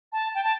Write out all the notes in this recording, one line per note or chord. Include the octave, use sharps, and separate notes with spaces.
A5
G5
A5